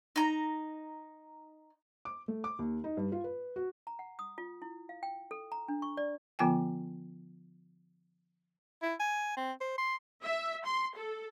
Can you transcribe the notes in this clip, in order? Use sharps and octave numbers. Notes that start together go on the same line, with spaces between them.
D#4 A#5
D6
A3
D6
D#2
D#4
G2
F4
B4
F#4
A#5
F#5
D#6
F4
E4
F5
G5
A4
A#5
D4
C#6
D5
D3 F3 B3 F4 G5 G#5
E4
G#5
C4
C5
C6
E5
C6
A4